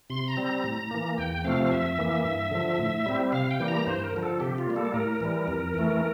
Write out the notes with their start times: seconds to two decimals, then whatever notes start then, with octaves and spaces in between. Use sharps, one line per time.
0.10 C3 C6
0.28 A#5
0.37 G3 C4
0.46 A#5
0.64 A2
0.91 E3 A#3
1.18 E2 G5
1.44 C3 F3 A3 C4 F5
1.71 F2 E5
1.99 E3 A#3
2.25 G2
2.51 D3 F3
2.79 A2
3.06 G3 C4
3.32 C3 F5
3.51 G5
3.60 E3 G3 A#3
3.68 A#5
3.87 G2 C5
4.04 A#4
4.13 D3 F3
4.23 A4
4.40 C3 G4
4.58 F4
4.67 G3 A#3
4.76 A4
4.94 A2 A#4
5.20 E3 G3
5.48 F2
5.74 E3 A3